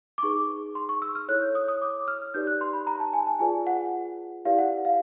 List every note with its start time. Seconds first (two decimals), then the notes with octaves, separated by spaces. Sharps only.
0.18 D6
0.23 D#4 G#4 B4 C#6
0.75 C6
0.89 C#6
1.02 E6
1.15 F6
1.29 E4 A4 C#5 F#6
1.42 G6
1.55 D#6
1.68 D#6
1.82 D6
2.08 F6
2.34 D#4 G4 B4 D5 G6
2.47 F#6
2.61 C6
2.73 B5
2.87 A#5
3.00 A5
3.13 G#5
3.27 A5
3.39 F4 G#4 B4 D5 G#5
3.67 F#5
4.45 E4 G4 B4 D5 F5
4.58 F#5
4.85 F5